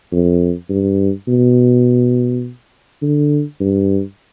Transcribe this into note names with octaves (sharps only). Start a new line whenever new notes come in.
F2
G2
B2
D3
G2